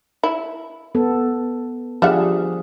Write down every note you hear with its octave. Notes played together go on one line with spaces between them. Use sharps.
E4
B3 A4
F3 G3 D4 G#4 E5 F#5